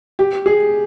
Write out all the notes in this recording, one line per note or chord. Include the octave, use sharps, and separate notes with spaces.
G4
G#4